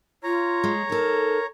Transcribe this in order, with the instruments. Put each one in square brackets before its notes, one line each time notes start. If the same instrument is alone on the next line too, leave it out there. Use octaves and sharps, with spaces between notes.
[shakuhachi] F4 [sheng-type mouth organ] C#5 A#5
[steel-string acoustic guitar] G#3
[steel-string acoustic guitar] D#4 A4 [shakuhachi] A#4